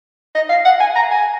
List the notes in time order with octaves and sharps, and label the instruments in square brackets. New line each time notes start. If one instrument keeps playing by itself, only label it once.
[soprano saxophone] D#5
F5
F#5
G#5
A#5
G#5